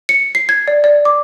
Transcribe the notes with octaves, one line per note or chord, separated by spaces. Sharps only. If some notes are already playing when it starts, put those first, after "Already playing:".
C#7
C7
G#6
D5
D5
D6